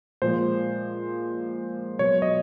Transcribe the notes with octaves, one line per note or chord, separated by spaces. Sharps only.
A#2 F3 G#3 C5
B2 F#3 C#5
D#5